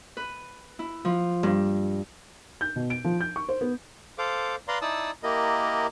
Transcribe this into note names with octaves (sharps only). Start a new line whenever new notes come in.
B4
E4
F3
G2
G6
B2
D7
F3
G6
C#6
C5
B3
A4 C5 F5 D6
B4 D5 F5 A#5 C6
D#4 E4 D5 A5 D#6 E6
A#3 E4 G4 A#4 D#5